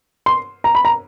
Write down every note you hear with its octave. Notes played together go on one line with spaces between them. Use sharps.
C6
A#5
B5
A#5